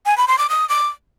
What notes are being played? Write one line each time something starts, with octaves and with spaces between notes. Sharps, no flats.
G#5
B5
C6
D6
D#6
D6